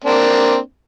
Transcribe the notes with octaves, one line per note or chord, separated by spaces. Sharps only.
A#3 C4 D4